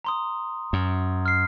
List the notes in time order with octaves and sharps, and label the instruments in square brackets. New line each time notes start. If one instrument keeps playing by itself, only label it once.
[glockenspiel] A#5 C6 D#6
[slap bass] F#2
[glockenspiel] F6 C7